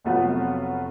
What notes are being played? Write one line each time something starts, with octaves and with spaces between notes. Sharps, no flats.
F1 F#3 A3 B3 F4 F#4